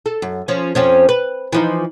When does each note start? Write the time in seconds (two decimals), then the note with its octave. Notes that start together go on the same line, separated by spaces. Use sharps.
0.06 A4
0.22 F#2
0.48 F3 C#4
0.75 F2 F3 C#4
1.09 B4
1.52 E3 F3 D#4